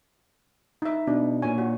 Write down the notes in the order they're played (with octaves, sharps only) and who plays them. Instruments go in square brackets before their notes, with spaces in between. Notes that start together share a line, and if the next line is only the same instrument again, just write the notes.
[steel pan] D#4 E5
[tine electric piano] B2 [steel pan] D4
[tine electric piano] A#2 C#5 [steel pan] G#5
[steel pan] F#4